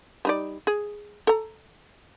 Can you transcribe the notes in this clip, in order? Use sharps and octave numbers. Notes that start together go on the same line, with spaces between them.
G3 D#4 D5
G#4
A4 A#5